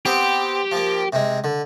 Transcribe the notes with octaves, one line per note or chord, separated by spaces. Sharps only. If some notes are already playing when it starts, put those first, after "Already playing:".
B3 C4 G4 C5
F3 A#3
C3 G#3
D3